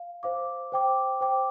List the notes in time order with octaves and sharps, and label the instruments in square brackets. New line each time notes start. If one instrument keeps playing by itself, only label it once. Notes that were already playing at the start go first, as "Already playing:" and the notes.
Already playing: [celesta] F5
C5 F5 D6
C5 G5 D6
C5 G5 D6